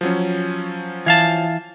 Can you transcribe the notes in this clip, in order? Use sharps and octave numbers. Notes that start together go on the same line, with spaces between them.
F3 F#3 C#4
E3 F5 A5